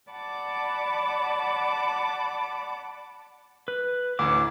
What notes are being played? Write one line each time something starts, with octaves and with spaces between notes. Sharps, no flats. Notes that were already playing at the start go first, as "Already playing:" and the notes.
D5 F#5 A5 B5 D6
B4
A1 D2 D6